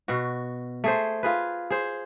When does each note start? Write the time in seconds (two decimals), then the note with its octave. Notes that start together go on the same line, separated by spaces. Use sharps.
0.08 B2 F#4
0.84 A3 G#4 C5
1.23 F4 G#4 B4
1.70 G#4 C5